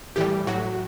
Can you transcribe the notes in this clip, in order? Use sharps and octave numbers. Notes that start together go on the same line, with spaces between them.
A2 E3 G3 G4
A2 F#3 F#4